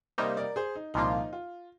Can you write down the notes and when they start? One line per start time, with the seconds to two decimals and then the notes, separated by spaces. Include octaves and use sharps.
0.18 C3 G3 A#3 D#4 C5 D#5
0.37 A#4 D5
0.56 G#4 C5
0.76 D#4
0.94 C2 A#2 F3 A#3 D#4 F4
1.33 F4